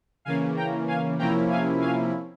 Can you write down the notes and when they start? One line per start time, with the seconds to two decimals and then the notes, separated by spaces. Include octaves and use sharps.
0.25 C#3 E3 A#3 C#4 F5 G#5
0.56 G5 A#5
0.87 F5 G#5
1.18 C3 F3 A#3 C#4 E4 G5 A#5
1.50 F5 G#5
1.81 F5 G#5